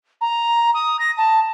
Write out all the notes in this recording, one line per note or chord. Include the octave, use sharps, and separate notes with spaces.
A#5
D#6
A#6
A5